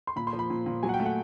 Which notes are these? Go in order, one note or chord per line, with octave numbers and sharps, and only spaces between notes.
C6
A#2 B5
C6
F3
B5
A#2
A#2
F#3 G#5
F#5
G5
A3
F#5